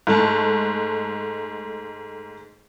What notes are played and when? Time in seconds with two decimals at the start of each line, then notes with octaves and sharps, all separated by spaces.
0.07 G#2 A3 A5